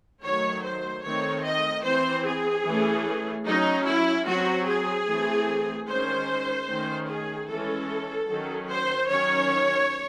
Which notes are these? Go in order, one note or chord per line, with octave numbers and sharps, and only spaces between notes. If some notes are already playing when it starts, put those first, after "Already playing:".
D#3 F#3 A3 C#5
C5
D#3 A3 C4 C#5
D#5
E3 C4 C5
G#4
E3 A3 C#4
F#3 C#4 D#4
E4
F#3 C4 F#4
G#4
E3 A3 C4
D#3 G#3 C#4 C5
D#3 A3 C#4
G#4
E3 G#3 C#4 A4
D#3 F#3 C#4
C5
D#3 F#3 C#4 C#5